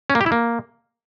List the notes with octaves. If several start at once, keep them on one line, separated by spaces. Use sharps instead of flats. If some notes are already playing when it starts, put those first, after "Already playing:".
C#4
A#3
G4
E4
A#3